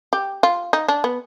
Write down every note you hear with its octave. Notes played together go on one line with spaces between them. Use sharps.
G4
F4
D#4
D4
B3